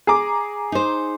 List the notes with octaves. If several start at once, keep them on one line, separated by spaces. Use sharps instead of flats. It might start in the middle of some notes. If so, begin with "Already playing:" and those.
G#4 A#5 D6
D#4 C5